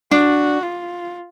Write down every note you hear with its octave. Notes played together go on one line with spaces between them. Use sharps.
D4 F#4
F4